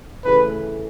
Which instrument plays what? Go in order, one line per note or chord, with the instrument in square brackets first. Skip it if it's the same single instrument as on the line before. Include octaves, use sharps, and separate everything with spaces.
[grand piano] C#3 E3 A3 [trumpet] B4